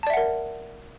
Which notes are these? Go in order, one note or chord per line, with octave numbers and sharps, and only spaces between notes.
A#4 D5 E5 F#5 A5